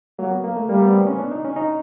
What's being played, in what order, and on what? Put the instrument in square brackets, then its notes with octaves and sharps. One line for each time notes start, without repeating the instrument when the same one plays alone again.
[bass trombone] F#3 [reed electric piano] A#3
[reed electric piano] B3
A#3
A3
[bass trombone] G3 [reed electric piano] A#3
[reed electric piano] B3
C4
C#4
D4
D#4
C#4
D#4